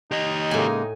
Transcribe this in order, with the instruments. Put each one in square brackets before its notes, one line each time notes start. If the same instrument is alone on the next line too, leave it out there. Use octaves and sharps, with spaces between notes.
[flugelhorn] D#4 [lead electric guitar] G4 D#5
[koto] A2 G#5 [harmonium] C#3 G#3 A#3